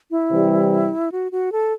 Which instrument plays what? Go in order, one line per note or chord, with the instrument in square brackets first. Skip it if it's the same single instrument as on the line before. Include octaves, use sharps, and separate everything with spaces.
[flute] E4
[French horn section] C3 E3 G3
[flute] F#4
F#4
A4